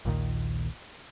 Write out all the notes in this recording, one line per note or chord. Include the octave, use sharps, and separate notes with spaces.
A#1 D#2 A#2 D#3